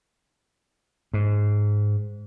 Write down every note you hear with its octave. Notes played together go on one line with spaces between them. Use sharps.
G#2